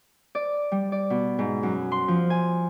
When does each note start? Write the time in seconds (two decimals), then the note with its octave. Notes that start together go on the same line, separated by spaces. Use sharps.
0.35 D5
0.72 G3
0.92 D5
1.10 B2
1.39 G#2
1.63 F#2
1.92 C6
2.08 F3
2.30 G#5